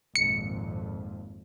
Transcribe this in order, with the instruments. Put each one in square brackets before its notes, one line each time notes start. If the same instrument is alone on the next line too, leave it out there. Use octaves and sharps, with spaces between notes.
[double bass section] G#1 F2 A#2 [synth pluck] C#7